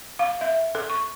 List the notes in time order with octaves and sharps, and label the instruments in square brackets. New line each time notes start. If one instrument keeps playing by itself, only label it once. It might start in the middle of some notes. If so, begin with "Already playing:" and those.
[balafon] F5
E5
A4
C#6